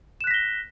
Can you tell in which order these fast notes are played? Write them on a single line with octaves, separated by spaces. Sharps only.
E7 F#6 B6 A#6 G7